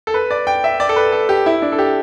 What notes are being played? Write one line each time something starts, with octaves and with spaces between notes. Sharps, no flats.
A4
B4
D5
G5
E5
D5
A4
B4
A4
G4
E4
D4
A4
G4